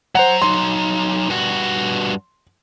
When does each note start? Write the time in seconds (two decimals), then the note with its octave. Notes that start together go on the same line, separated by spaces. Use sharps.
0.15 F#3 C5 F#5 A#5
0.42 F#3 D#4 C6
1.29 G2 F#4